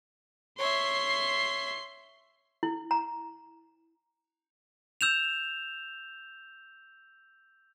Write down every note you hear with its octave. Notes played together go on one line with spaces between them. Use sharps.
C#5 E5 C6 C7
E4
A#5
E6 G6 E7 F7